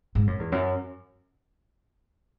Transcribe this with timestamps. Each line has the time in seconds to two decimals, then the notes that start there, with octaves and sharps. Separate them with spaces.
0.15 G#2
0.27 F#2
0.39 E2
0.52 F#2